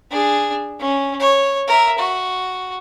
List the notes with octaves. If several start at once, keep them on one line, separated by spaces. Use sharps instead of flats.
D4 G#4
C#4
C#5
A#4 E5
F#4